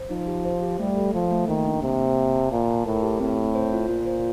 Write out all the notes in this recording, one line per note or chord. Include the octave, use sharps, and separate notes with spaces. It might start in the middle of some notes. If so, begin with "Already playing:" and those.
Already playing: C5
F3 D#4
G4
C5
G4
G3 A3
A4
F3 A4
A3
D#3 A#3
D4
C3 A#3
A#3
F5
A5
A#2 F5
A5
A2 A#4
G4
A2 C4
C4
C5
F4
A#2 F4
C5